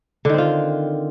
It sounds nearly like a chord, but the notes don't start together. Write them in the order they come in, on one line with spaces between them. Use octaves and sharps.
D3 D#3 C4 F4